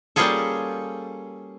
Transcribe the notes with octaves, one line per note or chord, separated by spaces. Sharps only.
G3 A#3 C#4 F4 G#4 A4